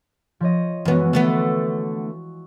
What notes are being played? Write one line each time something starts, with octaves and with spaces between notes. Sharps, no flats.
F3 C#5 D#5
F#2 E3 G#3 B3 F#4
D3 A3 B3 A6